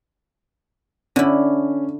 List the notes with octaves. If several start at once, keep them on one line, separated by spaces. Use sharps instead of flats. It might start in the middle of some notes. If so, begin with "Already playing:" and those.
D3 C#4 E4